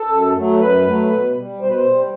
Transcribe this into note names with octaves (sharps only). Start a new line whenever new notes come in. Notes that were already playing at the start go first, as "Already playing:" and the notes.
Already playing: A4
F#2
F#3 A3
F#2 B4
F#3 A3
B2
G3
B2 C5
B4
C5
G3